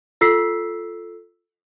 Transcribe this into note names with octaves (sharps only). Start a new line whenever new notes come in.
F4 A4 E6 B6 C7